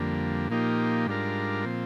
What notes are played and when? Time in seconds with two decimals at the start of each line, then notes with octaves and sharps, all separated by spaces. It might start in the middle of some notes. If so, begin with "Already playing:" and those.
Already playing: F2 D3 G3 A#3
0.49 A#2 F3 A#3 D#4 G4
1.06 G#2 G3 D4 F4 A#4
1.64 A#2 F3 C4